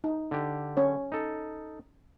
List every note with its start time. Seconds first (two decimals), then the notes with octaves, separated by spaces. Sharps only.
0.04 D#4
0.31 D3 G4
0.77 C#4 C#5
1.12 D#4 A4